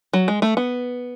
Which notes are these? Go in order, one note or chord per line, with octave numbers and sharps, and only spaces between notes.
F#3
G#3
A3
B3